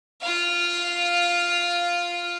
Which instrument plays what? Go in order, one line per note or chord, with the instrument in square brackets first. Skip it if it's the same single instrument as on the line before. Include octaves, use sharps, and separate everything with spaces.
[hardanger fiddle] F4 F5